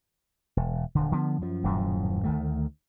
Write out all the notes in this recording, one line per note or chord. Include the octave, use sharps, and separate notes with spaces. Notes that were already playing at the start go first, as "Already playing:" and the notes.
E1
D#1 D3
D3 F3 B3
F#2 F3
D#1 F#2 A2 F3
D2 D#3 A3